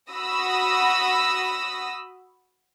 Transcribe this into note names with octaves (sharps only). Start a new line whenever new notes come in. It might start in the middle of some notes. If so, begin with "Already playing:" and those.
F#4 B5 D#6 E6 A#6